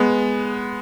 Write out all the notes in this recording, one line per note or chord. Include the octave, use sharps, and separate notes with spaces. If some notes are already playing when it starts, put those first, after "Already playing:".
Already playing: G#3 B3